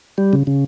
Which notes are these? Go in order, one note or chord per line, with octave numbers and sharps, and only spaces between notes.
G3
C#3
C#3